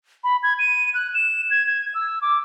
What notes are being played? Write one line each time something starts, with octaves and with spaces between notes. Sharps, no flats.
B5
G#6
D#7
F#6
E7
G#6
G#6
E6
D6